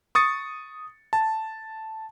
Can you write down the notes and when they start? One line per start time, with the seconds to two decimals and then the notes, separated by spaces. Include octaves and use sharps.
0.15 C#6 D#6 A6 C#7
1.13 A5